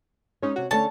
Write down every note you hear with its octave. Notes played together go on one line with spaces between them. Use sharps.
G#3 C#4 D#4 C#5
C3 F#4
D3 A3 C#4 C#5 A5